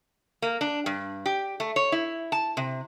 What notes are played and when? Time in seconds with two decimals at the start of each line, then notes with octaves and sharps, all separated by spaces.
0.42 A#3
0.61 D4
0.86 G2
1.26 G4
1.60 A3
1.76 C#5
1.92 E4
2.32 A5
2.57 C3